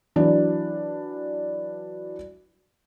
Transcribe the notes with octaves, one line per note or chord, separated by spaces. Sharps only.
E3 F#3 D4